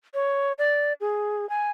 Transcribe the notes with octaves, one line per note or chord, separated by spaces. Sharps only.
C#5
D5
G#4
G#5